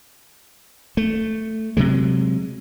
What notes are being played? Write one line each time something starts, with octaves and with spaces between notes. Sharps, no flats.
A3
C3 F#3 G#3